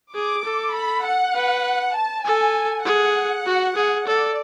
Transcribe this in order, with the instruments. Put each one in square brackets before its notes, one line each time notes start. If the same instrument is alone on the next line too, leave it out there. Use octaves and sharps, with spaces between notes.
[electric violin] G#4 [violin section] D6
[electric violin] A4
[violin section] B5
F#5
[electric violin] B4
[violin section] A5
[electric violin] A4 [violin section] G#5
[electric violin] G#4 [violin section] F#5
[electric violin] F#4
G#4
[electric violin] A4 [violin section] D5